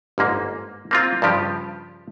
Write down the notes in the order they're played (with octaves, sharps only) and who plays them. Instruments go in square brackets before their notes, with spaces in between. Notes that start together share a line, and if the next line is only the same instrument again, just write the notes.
[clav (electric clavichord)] G1 G#2 A#3
A#3 C4 F4
G2 C#3 F3 G4